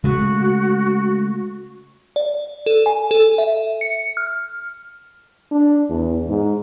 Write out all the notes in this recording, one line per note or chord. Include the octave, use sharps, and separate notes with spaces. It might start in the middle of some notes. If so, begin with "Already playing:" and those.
C#3 G#3 A3 F#4
D5
A4
G#5
A4
E5
C#7
F6
D4
E2
G#2